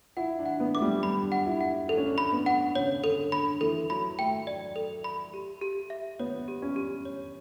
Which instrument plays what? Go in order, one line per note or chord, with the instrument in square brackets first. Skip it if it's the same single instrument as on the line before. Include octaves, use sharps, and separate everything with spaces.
[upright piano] E4 [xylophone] F#5
[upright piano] D4
[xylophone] F#5
[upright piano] B3
[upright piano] A3 [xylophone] D6
[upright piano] G3
[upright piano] D4 [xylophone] B5
[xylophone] F#5
[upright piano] E4
[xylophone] F#5
[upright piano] D4 [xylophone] A4
[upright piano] C#4
D4
[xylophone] B5
[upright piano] B3
[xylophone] F#5
[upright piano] C#3 [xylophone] C#5
[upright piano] D3 [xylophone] A4
[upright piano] D3 [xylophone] B5
[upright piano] E3 [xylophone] A4
[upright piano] F#3 [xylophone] B5
[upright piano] A3 [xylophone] G5
[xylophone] D5
A4
B5
G4
G4
E5
[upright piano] B3 [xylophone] C#5
[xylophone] G4
[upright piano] C#4
[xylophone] G4
C#5